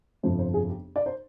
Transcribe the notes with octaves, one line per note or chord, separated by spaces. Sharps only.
G1 F2 C3 F3 C5
C5
G#4
G4
D5
C5